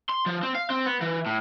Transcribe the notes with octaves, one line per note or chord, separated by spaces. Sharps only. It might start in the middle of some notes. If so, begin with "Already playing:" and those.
C6
F3
C4
F5
C4
B3
E3
A2